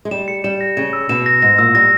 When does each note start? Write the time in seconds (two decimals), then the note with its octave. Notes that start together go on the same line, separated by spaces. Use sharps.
0.05 G#3
0.11 G3 E7
0.28 C#7
0.44 G3 E7
0.61 A#6
0.77 C#3 E7
0.93 E6
1.09 B2 E7
1.26 A#6
1.42 G#2 A#6
1.58 A#2 E6
1.75 G3 A#6